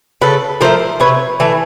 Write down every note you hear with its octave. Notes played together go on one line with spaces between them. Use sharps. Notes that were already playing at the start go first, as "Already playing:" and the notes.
C#3 A4 B4
F3 A3 A#4 C5
C3 B4 C#5
E3 A3